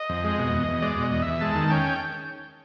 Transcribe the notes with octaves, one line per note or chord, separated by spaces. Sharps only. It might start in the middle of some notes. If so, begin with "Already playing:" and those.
Already playing: D#5
F2
G#3
B2
E2
E2
G#3 D5
B2 D#5
E2
E2 E5
G#3 A5
D#3
C#4 G5